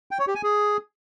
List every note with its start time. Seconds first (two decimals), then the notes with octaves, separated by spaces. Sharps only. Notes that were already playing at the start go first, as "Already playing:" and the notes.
0.11 G5
0.19 C#5
0.27 G4
0.35 G#5
0.43 G#4